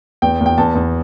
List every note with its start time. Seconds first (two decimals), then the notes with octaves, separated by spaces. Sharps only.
0.22 E2 G5
0.41 E2
0.46 G5
0.58 E2 A5
0.75 E2